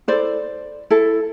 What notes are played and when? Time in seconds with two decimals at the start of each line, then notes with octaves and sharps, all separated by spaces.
0.08 E4 A4 C5 D5
0.90 E4 A4